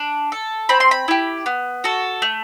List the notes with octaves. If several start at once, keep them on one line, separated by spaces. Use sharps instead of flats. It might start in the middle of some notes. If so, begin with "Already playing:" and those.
Already playing: D4
A4
C4 B5
C6
B5
E4 G4
B3
F#4 A4
A3